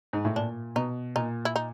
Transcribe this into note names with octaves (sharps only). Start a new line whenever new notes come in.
G#2
A2
A#2 D4
B2 D#4
A#2 D#4
E4
D#4